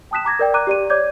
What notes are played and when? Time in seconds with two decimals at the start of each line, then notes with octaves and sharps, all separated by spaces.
0.11 G5 A5 D#6 F#6 B6 E7
0.25 A#5 D6 G#6 A#6
0.39 A#4 D5 G5
0.54 A#5 D6 F#6 D#7
0.67 G4 D5 D#7
0.90 C#5 D5 D6 G6 G#6